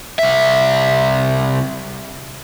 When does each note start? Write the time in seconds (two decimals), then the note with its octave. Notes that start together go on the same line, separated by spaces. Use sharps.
0.19 C2 E5